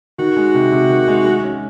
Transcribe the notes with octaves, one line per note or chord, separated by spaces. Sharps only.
D#3 F#4
G#3
C3
C3
D#3
G#3
G#3
C#4